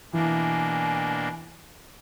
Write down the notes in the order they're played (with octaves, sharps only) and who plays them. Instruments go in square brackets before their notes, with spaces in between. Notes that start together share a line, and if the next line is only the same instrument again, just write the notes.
[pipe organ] B2 A#3 D4 [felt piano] E3 [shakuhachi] G#5